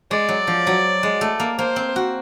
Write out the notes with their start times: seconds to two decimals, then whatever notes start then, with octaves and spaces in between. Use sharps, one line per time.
0.11 G#3 D5
0.29 F#3
0.47 F3
0.67 F#3
1.03 G#3
1.21 A3
1.40 A#3
1.59 A#3 C5
1.76 C4
1.96 F#4